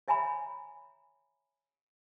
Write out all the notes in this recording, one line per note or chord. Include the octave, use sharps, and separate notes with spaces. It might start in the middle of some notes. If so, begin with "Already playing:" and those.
C#5 E5 G#5 A#5 B5